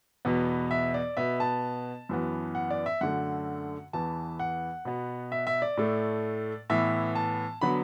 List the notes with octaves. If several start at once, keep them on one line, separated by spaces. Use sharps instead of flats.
E2 B2 B3
E5
D5
B2 B3 E5
A5
F#2 E3 B3
F#5
D5
E5
F#2 D3 A3 F#5
E2 E3 B3 A5
F#5
B2 B3
E5
E5
D5
A2 A3
A2 E3 B3 E5
A5
D3 F#3 B3 B5